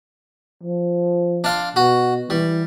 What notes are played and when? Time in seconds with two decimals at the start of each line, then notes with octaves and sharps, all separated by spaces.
0.63 F3
1.44 D4 F5 C6
1.76 B2 F#4
2.30 E3 G3